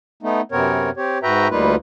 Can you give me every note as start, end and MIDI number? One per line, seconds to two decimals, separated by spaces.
0.23 0.41 57
0.23 0.41 59
0.23 0.41 63
0.52 0.90 42
0.52 0.90 48
0.52 0.90 59
0.52 0.90 60
0.52 0.90 70
0.52 0.90 73
0.97 1.18 60
0.97 1.18 67
0.97 1.18 73
1.23 1.48 44
1.23 1.48 66
1.23 1.48 71
1.23 1.48 76
1.23 1.48 79
1.23 1.48 82
1.50 1.75 38
1.50 1.75 55
1.50 1.75 58
1.50 1.75 63
1.50 1.75 65
1.50 1.75 71